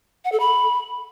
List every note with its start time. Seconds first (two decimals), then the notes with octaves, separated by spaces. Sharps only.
0.25 F#5
0.32 A4
0.40 B5